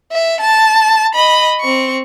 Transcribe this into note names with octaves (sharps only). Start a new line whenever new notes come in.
E5
A5
D#5 B5
C4 C#6